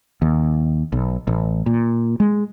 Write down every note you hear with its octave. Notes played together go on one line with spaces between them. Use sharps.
D#2
B1
A1
A#2
G#3